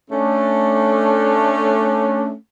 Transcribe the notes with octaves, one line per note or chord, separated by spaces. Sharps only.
A3 C#4 D4